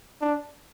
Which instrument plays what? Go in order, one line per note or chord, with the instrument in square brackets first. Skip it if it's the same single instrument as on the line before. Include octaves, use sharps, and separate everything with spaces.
[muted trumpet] D4